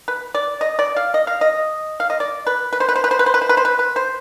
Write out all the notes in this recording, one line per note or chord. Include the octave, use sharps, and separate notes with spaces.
B4
D5
D#5
D5
F5
D#5
F5
D#5
F5
D#5
D5
B4
B4
C5
B4
C5
B4
C5
B4
C5
B4
C5
B4
C5
B4
B4
C5